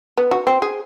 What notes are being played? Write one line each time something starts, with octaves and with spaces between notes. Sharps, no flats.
B3
F#4
C4
G#4